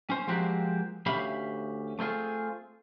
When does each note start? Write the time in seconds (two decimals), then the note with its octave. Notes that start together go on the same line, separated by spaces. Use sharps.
0.10 C#4 C5
0.27 F3 G#3 A#3 C4 F#4 G4
1.06 D2 C#4 G4 E5 F5 B5
1.99 A3 C4 F4 G#4